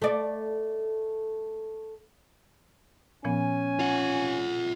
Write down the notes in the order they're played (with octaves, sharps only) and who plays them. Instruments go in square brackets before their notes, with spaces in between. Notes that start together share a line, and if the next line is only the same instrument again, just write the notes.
[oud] A3 D5
[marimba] A#2 F3 B3 [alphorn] C#4 [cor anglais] G#5
[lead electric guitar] F4 F#5